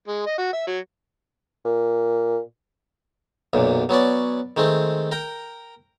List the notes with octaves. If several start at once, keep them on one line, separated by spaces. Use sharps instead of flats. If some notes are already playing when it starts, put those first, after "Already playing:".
G#3
D#5
F#4
E5
F#3
A#2
B1 F#2 A#2
F#3 B3 C#4 D5
D#3 G#3 A3 C4
A#4 G5 A#5